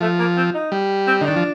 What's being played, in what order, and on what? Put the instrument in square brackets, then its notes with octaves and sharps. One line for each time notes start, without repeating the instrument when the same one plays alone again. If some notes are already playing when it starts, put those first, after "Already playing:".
[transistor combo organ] F3 [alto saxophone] A3
[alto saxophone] A#3
C4
D#4
[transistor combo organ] G3
[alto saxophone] C4
[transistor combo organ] D3 [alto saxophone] D#4
[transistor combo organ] D#3 [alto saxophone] D4
[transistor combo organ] F3